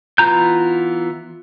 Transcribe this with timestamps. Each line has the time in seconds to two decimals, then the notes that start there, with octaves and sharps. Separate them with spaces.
0.18 E3 B3 F4 A#5 G6